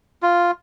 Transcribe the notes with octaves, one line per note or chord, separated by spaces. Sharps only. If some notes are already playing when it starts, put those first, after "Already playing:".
F4